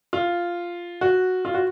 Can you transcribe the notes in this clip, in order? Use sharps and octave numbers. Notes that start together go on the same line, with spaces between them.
F4
F#4
F4
F#4